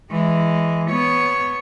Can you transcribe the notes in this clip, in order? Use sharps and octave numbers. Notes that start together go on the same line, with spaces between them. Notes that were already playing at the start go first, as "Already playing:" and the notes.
E3 G#3
B3 C#5